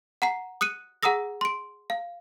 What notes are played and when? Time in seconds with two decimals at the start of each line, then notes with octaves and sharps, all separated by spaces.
0.22 F#5 A#5 C7
0.61 D#6 F#6 C#7 D#7
1.03 G#4 F#5 A#5 D#6 E6 A#6
1.41 C6 D7
1.90 F5